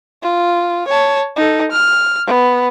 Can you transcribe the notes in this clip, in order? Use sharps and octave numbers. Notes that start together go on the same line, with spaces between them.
F4
C#5 A5
D#4 A4
F6
B3